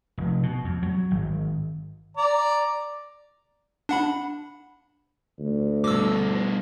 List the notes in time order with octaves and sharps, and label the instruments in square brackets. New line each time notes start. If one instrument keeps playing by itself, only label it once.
[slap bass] F1
B2
F2
F#3
G#1
[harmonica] D5 A#5
[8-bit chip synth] D4 F#5 B5
[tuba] D2
[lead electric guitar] G2 B2 [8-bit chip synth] D6 E6